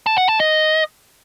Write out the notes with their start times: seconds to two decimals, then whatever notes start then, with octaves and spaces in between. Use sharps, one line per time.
0.06 A5
0.18 F#5
0.29 A5
0.40 D#5